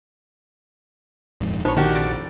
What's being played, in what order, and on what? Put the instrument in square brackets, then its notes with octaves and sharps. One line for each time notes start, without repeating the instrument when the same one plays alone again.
[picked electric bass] D#1 F2 G#2
[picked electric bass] A#1 [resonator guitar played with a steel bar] B3 C#5 [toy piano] D#4 E4 C5
[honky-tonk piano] D#3 [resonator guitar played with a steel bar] D4 F#4 G4
[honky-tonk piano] F1 A6 D7